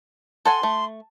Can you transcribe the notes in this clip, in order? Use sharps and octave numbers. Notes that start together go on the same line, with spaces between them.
A4 F#5 G#5 C6
A3